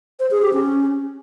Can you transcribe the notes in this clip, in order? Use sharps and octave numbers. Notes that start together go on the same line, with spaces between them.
C5
G#4
G4
C#4